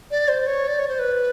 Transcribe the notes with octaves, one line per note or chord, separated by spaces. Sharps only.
D5
C5
C#5
D5
C#5
C5
B4